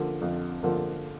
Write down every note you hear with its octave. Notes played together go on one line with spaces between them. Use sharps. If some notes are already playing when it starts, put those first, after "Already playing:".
Already playing: D3 F3 A#3
F2
D3 F3 A#3